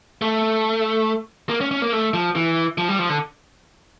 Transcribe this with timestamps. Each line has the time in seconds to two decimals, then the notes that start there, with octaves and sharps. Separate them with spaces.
0.22 A3
1.49 A#3
1.61 C#4
1.71 C#4
1.82 A#3
1.93 A3
2.14 F3
2.35 E3
2.78 F3
2.88 G3
2.99 F3
3.10 D3